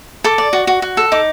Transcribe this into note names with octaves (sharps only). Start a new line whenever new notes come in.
A4 D6
D5
F#4
F#4
F#4
A4
D#4 D6